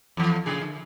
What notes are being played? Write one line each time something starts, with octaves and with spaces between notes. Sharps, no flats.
F2 E3
A#2 C#3 G#4
D3